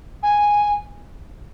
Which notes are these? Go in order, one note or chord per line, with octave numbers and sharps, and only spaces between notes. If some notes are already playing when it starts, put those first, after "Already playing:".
G#5